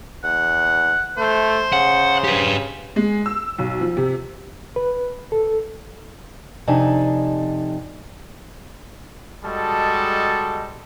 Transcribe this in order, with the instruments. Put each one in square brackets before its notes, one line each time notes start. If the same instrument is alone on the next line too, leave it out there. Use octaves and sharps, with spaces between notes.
[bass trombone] E2 [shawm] F#5
[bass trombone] A3 [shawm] C5
[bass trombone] C#3 [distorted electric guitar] F#5
[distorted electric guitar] G4 B4
[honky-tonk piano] G#3
E6
B1
F3
C3
[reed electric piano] B4
A4
[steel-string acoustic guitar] F2 C3 D4 D#4 G#5
[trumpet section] G3 G#3 F#4 A4 D#5 A5